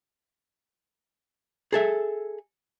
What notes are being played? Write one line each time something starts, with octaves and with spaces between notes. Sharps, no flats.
G#4 A4 E5